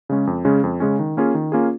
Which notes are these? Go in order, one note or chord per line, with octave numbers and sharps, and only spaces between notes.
C#3 G#3 C#4
F2
C#3 G#3 C#4
F2
C#3 G#3 C#4
D#3
A#3 C#4 F4 G#4
D#3
A#3 C#4 F4 G#4